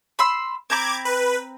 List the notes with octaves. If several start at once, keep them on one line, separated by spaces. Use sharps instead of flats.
B5 C6 E6
C4 A#5 B5 D6 G#6
B4